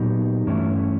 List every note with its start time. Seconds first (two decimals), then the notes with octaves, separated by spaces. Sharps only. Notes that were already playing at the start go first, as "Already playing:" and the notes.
Already playing: A#2 F#3 B3 D#4 G4
0.47 G2 E3 A3 C#4 E4